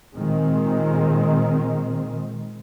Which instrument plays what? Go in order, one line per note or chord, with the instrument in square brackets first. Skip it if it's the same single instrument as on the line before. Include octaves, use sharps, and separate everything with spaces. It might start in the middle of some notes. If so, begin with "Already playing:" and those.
[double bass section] A#2 D#3 G#3 C4